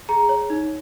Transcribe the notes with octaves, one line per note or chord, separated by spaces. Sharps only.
G#4 A#5
C#5
D#4